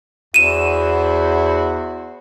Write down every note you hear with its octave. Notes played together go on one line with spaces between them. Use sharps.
E2 E4 F#4 C5 D#7 E7